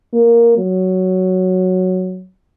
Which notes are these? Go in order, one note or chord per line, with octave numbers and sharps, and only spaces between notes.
A#3
F#3